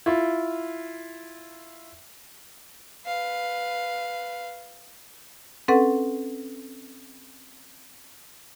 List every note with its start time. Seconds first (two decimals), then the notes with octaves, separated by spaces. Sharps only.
0.06 E4 F4
3.05 B4 F5
5.68 C4 C#4 A4 B4 F#5